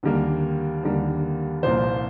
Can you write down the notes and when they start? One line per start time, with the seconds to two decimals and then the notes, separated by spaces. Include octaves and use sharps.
0.03 D#2 D3 G3 A#3
0.83 D#2 D3 G3 A#3
1.63 C2 A#2 F3 A#3 C5